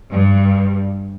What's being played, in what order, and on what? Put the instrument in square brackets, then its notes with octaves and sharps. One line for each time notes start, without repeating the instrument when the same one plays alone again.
[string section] G2